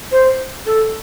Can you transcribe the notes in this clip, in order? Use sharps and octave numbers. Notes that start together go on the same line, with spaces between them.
C5
A4